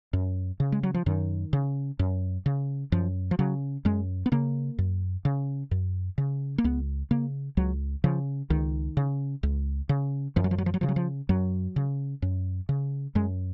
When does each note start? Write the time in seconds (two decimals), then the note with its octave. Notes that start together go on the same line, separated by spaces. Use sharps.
0.13 F#2
0.60 C#3
0.72 G#3
0.83 F#3
0.94 F3
1.06 F#2 D#3
1.53 C#3
1.99 F#2
2.46 C#3
2.92 F#2 F3
3.31 F3
3.39 C#3 F#3
3.85 F#2 G#3
4.26 B3
4.32 C#3 A#3
4.78 F#2
5.25 C#3
5.71 F#2
6.18 C#3
6.58 A#3
6.64 C#2 B3
7.11 C#3 A#3
7.57 C#2 F#3
8.04 C#3 F3
8.50 C#2 D#3
8.97 C#3
9.43 C#2
9.89 C#3
10.36 F#2 F3
10.44 F#3
10.51 F3
10.58 F#3
10.66 F3
10.74 F#3
10.81 C#3 F3
10.89 F#3
10.96 F3
11.29 F#2 F#3
11.76 C#3
12.22 F#2
12.69 C#3
13.15 F#2 G#3